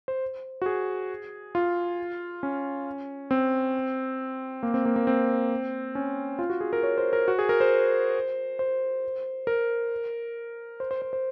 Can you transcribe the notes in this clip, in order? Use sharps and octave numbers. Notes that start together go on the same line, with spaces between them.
C5
F#4
G#4
F4
C#4
C4
A#3
C4
A#3
A#3
C4
C#4
F4
F#4
G#4
A#4
C#5
C5
A#4
F#4
G#4
A#4
C5
C5
A#4
C5
C5
C5
C5